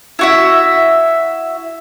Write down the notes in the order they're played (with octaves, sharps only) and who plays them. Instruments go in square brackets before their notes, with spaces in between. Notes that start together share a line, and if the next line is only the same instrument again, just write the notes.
[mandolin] E4 F#4 E5